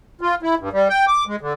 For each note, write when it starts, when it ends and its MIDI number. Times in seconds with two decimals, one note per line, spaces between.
0.21 0.35 65
0.42 0.55 64
0.59 0.69 43
0.73 0.88 55
0.89 1.05 79
1.08 1.24 86
1.27 1.36 56
1.41 1.53 50